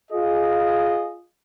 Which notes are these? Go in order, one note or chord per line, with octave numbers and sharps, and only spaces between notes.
F4 G#4 D#5